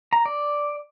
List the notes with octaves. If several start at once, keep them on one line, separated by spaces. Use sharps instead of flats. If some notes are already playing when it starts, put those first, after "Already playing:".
A#5
D5